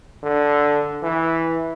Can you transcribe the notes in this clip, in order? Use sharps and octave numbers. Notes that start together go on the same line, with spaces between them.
D3
E3